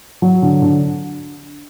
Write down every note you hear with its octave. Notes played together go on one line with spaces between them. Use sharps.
F#3
D3
D3